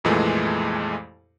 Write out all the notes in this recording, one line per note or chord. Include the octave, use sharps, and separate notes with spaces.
C2 F2 A#2 E3 G#3 A3